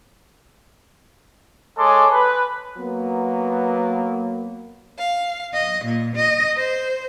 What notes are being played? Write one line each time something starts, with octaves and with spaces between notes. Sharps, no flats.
G#3 A4 C#5 G#5 C6 D6
B4
F#3 A#3 B3
F5
D#5
A#2
D#5
C5